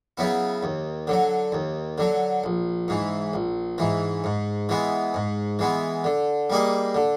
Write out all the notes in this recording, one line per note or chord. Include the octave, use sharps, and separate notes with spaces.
C#3 F#3 B3 E4
D#2
D3 F#3
D#2
D3 F#3
A#1
G#2 E3
A#1
G#2 E3
G#2
E3 G#3 B3
G#2
E3 G#3 B3
D3
G3 A#3 D#4 G#4
D3